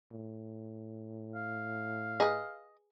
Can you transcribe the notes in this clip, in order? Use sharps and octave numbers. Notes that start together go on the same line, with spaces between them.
A2
F5
G#4 B4 D#5